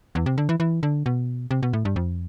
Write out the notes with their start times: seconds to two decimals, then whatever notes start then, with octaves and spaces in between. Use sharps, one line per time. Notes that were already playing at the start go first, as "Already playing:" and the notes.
0.15 E2
0.26 C3
0.38 D3
0.49 E3
0.60 E3
0.83 D3
1.06 B2
1.51 C3
1.63 B2
1.73 A2
1.85 G2
1.96 F2